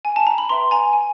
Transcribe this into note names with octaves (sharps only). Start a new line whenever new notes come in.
G#5
A5
A#5
B5
B4 E5 G5 A#5 C6
G#5 A#5
G#5